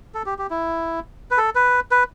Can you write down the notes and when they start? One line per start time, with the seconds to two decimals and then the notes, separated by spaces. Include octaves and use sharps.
0.14 A4
0.26 G4
0.39 G4
0.50 E4
1.31 B4
1.37 A4
1.55 B4
1.91 B4